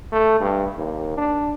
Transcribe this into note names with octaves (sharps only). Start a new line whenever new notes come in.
A3
G2
D#2
D4